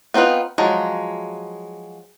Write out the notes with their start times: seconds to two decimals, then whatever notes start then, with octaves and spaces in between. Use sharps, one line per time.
0.14 B3 C4 D#4 F4 B4
0.58 F3 F#3 G#3